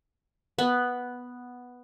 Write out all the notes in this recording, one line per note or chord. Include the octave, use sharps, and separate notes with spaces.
B3